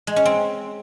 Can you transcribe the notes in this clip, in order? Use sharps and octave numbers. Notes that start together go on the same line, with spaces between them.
G#3
C#4
C4